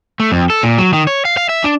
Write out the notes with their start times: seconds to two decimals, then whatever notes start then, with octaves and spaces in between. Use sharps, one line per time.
0.20 A3
0.32 F2
0.50 A4
0.63 A#2
0.78 F#3
0.93 D#3
1.07 C#5
1.25 F5
1.37 F5
1.49 E5
1.64 D4